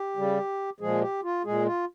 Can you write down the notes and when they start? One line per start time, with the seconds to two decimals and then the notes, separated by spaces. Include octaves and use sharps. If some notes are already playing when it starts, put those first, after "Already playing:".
Already playing: G4
0.16 C#3 G3
0.80 A#2 F3 G#3 G#4
1.01 G4
1.23 F4
1.44 A#2 G#3 G#4
1.66 F4